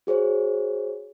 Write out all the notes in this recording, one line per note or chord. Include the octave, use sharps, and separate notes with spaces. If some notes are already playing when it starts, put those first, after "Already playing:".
F#4 G#4 C5 C#5